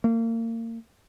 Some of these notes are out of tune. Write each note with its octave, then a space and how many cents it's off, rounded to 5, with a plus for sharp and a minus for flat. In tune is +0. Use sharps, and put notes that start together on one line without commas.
A#3 -35